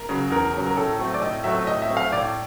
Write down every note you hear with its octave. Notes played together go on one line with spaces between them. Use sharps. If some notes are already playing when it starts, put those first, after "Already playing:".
Already playing: A#4
C#3 F#3
E2 A#4
C#3 F#3
A#4
A2 A4
F#3 A3 C4
D5
A2 D#5
F#3 A3 C4 E5
A2 D#5
E5
F#3 A3 C4
F5
A2 D5